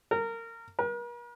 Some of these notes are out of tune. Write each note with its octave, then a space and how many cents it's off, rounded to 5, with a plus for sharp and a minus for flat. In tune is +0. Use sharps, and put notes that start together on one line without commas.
A#4 -25
A#4 +45